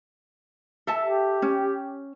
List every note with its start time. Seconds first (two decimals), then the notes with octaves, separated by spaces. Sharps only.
0.87 A4 E5 A5
1.01 G4
1.42 C#4